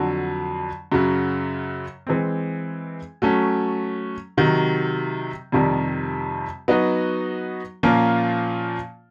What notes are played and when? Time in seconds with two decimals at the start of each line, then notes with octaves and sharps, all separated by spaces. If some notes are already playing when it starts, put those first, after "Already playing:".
Already playing: F2 D3 F#3
0.92 F#2 C#3 F#3
2.07 E3 G#3 C4
3.22 F#3 A3 C#4
4.37 C3 D#3 F#3
5.52 F2 C3 D#3 G3
6.68 F#3 B3 D#4 F#4
7.83 A#2 F3 A#3 C#4 F4